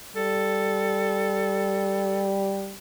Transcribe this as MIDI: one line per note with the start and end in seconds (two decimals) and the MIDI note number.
0.16 2.77 55
0.16 2.27 69